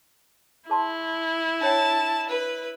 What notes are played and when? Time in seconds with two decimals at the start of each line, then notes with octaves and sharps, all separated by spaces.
0.70 E4 G#4 A5 C6
1.61 D4 C#5 G5 A5
2.29 B4